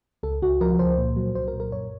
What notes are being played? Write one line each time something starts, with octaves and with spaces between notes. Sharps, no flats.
C#2 A4
C#2 F#4
F3 A#4
C#2 C5
A#2
F#3
C2 C5
A#4
A#2
A#4
F#2 C#5